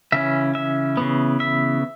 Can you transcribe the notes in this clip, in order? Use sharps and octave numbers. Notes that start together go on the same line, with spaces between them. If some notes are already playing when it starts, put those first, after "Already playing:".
C#3 E3 C#4 E5
E5
C#3 E3 B3
E5